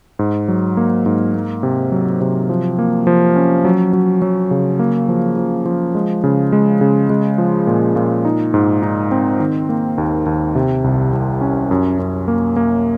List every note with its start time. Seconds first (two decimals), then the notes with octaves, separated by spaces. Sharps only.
0.19 G#2
0.48 F#3
0.77 A#3
1.06 G#2
1.35 A#3
1.63 C3
1.92 F#3
2.21 C3
2.49 F3
2.79 A#3
3.07 F3
3.36 C#4
3.65 F#3
3.93 F#3
4.22 F#3
4.51 C#3
4.79 A#3
5.08 F3
5.38 F3
5.66 F3
5.95 G#3
6.24 C#3
6.52 G#3
6.81 C#3
7.10 G#3
7.38 F3
7.67 A#2
7.96 A#2
8.25 D#4
8.54 G#2
8.83 D#4
9.11 C4
9.40 D#3
9.69 A#3
9.98 D#2
10.26 D#2
10.55 C3
10.84 C2
11.13 C2
11.41 C#4
11.71 F#2
11.99 F#2
12.28 A#3
12.56 A#3